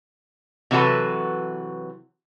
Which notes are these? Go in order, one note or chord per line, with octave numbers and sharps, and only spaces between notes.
C3 E3 F#3 F#4 A4 B4